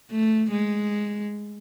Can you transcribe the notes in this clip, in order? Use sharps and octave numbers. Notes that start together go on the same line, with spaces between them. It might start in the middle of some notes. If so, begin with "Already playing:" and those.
A3
G#3